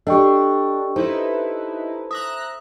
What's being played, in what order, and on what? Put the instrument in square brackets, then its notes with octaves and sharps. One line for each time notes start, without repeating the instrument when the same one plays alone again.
[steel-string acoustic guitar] D4 [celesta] G4 D#5 [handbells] A4 G5 C#6
[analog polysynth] D#4 E4 B4 [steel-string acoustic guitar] A4 [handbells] C5
[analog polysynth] E5 A#5 F#6 [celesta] D#6